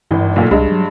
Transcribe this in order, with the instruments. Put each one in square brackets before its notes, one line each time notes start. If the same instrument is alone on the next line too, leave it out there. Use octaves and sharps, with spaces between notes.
[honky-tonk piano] G#1 E3 [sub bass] G2
[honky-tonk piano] B1 A#2 A3
[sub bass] C2 [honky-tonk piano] G2 G#3
[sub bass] F#3